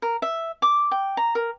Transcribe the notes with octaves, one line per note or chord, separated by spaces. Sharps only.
A#4
E5
D6
G5
A#5
A#4